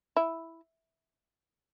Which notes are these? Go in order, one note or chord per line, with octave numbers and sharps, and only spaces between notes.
E4